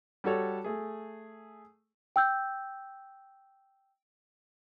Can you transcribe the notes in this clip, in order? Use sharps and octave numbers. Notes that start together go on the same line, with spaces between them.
G3 F#4 A4 C#5
A3 G#4
G5 E6 G6